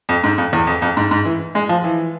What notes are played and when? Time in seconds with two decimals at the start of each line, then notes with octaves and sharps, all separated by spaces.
0.09 F2
0.24 G#2
0.38 F2
0.53 E2
0.67 F2
0.82 F2
0.97 G#2
1.11 G#2
1.25 E3
1.55 G#3
1.69 F3
1.84 E3